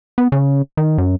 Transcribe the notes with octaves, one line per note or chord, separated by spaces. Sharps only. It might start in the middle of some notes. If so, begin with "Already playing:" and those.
B3
C#3
D#3
F#2